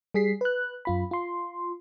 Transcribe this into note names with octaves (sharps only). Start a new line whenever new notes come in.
G3 G#4 B6 C7
B4 F#6
F#2 F4 B5
F4 C6